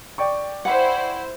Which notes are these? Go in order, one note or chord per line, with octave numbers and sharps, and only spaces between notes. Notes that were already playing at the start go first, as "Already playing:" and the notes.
D5 G5 C#6
E4 C5 F#5